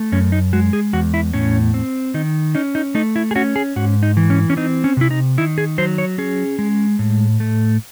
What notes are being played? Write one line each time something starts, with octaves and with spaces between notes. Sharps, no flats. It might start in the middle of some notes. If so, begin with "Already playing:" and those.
Already playing: A3
F#2 C#4
D#4
G#3 F#4
G#4
E2 F#4
E4
A2 C#4
C4
D#3 D#4
C#4 D#4
D#4
A3 D#4
E4
G#4
C#4 F#4
G#4
G#2 F#4
D#4
E3
C#4
C#4
C4 D#4
C#4
C3 E4
D#4
D#3 E4
G#4
F#3 C5
C#5
C#4 G#4
G#3
A2
A3